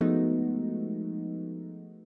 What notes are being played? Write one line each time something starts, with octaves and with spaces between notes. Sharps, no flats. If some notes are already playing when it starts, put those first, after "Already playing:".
F3 G#3 A3 B3 D#4 F#4